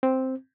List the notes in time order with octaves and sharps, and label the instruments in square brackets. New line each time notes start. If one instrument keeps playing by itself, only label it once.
[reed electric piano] C4